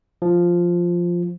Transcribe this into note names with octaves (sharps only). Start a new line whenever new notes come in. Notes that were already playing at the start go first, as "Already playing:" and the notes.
F3